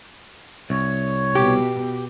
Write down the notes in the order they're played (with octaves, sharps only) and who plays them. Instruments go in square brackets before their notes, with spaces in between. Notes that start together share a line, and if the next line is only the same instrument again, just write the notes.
[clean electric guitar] C2 [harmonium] C#5
[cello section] B2 [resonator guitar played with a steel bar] G4